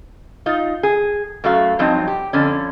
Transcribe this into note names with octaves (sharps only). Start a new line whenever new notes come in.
D#4 F4
G#4
F#2 A3 F#4 F5
G2 F3 F#3 C4 D#4
G4
F2 D3 C#4